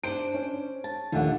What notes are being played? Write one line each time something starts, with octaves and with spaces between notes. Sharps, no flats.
D4 C5 D7
C#4
A5
A#1 D#2 D3 A3 F#5